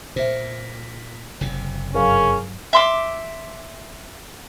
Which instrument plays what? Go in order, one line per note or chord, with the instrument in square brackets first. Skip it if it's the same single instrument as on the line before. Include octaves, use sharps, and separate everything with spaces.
[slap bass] A#2 [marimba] C5 E5
[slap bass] F#1 C3
[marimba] G2 F#3 [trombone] C#4 [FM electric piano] G#4 A#4 F5
[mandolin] E5 C6 D6